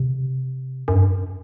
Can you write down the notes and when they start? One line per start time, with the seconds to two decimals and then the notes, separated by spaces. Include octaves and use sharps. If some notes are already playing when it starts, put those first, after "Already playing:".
Already playing: C3
0.88 F#2
0.95 G2
1.09 F#2